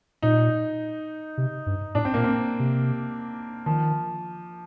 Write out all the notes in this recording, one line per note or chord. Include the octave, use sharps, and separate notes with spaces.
A#2 D#4
C3
G2
A2 D4
C4
A#2 A#3
C4
C3
D#3 F3